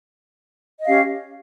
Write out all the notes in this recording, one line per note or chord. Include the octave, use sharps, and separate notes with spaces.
C#4 G4 D#5 F5